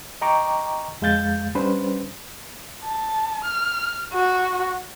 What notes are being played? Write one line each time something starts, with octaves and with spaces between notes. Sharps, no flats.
D#5 G5 A#5 C#6 D6
F2 G#3 F5 G6 A6
G3 C#4 D4 B4 C5
A5
F6
F#4